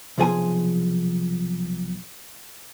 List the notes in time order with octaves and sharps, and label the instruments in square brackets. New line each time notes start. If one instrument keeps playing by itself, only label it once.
[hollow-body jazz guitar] B1 C3 F3 G#4 C5 G#5